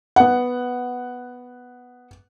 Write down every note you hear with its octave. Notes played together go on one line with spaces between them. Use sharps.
B3 F#5